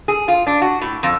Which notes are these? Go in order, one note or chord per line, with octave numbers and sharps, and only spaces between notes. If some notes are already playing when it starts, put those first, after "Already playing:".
G#4
F4
D4
F#4
A2
F2